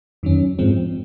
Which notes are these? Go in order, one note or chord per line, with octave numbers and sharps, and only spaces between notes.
F2 D#3 F#3 C#4
G#2 F3 G#3 C4